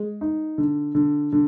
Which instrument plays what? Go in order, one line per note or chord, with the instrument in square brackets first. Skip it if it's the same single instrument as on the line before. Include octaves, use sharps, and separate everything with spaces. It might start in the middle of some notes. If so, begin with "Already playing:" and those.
Already playing: [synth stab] G#3
[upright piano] D#4
D3
D3
D3